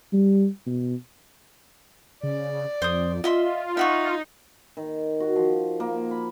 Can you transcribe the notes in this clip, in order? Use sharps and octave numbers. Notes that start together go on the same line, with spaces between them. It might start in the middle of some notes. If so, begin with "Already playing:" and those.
G3
B2
C#3 D5
F2 C5 D#6
F4 D#5 E5 C6
D#4 E5 F#5 C#6
D#3
F#4
F3
A#3
B5